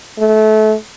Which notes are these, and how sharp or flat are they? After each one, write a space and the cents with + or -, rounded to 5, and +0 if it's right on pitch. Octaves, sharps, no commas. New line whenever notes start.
A3 -25